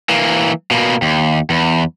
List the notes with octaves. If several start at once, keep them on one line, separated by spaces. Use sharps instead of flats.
E3 A#3
B2 A#3
D#2
E2